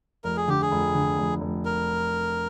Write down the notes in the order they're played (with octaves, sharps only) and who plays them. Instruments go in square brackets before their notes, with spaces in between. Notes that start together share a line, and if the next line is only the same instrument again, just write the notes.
[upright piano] F1 [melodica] A#4
[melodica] G#4
[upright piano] D3 [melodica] G4
[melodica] G#4
[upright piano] F1
D3
F1
F1
[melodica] A#4